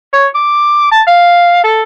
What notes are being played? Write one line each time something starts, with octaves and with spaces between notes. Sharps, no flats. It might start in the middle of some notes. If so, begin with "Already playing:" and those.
C#5
D6
A5
F5
A4